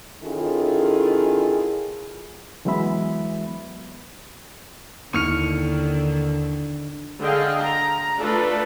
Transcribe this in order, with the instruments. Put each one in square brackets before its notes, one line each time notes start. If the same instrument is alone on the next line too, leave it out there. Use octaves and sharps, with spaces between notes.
[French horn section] D#3 C#4 E4 F4 G#4 A4
[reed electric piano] E3 F#3 G#3 B3 E5 B5
[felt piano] D#2 E4 D#7 [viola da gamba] D3 D#3 [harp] C#6 F6 C#7
[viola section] D3 G#4 D#5 F5 G5
A#5
A3 D4 F4 A4 B4